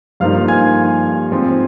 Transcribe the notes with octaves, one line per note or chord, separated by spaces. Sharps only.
G2 F3 A#3 D#4 F5 F6
G#5 G#6
G#2 F3 C4 D#4